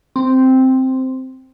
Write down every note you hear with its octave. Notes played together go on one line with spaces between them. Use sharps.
C4